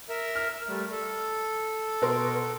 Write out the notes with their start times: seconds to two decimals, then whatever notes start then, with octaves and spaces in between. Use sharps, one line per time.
0.09 A#4 E5
0.35 F6
0.68 G3 A3
0.91 A4
2.02 B2 A#4 C6